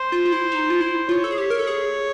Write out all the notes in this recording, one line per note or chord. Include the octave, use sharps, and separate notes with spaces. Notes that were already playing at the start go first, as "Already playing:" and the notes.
Already playing: C5
F4
F4
E4
D#4
F4
E4
F4 C#5
A4
G#4
G4
A#4
A4
G#4